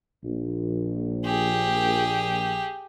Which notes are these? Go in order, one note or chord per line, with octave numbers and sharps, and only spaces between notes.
A#1
G4 G#4